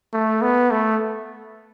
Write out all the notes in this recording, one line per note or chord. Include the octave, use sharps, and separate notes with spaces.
A3
B3
A3